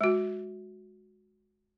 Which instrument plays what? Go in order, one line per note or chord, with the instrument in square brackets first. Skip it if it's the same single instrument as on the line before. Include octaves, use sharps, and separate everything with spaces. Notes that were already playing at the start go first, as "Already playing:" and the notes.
[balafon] G#3 F#4